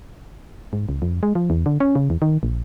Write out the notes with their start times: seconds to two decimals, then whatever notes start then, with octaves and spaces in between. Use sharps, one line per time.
0.73 G#2
0.89 C#2
1.02 F2
1.23 G#3
1.35 F3
1.50 E2
1.66 D3
1.80 C#4
1.95 C#3
2.10 E2
2.22 D#3
2.43 A#1